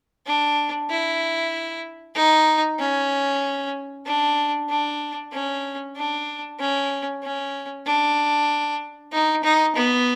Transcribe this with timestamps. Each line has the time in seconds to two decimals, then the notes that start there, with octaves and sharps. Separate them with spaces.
0.26 D4
0.90 E4
2.16 D#4
2.80 C#4
4.06 D4
4.69 D4
5.32 C#4
5.96 D4
6.60 C#4
7.23 C#4
7.86 D4
9.12 D#4
9.44 D#4
9.75 B3